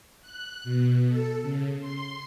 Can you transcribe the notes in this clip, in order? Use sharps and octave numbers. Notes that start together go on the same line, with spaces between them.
F#6
B2
A4
C#3
C6